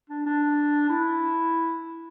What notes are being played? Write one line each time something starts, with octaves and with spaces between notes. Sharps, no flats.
D4
D4
E4